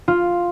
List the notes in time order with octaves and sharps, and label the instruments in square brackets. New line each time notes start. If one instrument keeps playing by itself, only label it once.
[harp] F4